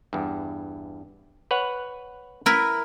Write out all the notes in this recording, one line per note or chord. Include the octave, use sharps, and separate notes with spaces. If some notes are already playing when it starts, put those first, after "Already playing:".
E2 G2
B4 C#5 F#5
E4 A#4 B4